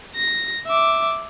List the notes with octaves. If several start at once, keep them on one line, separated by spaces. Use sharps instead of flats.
A#6
E5 D6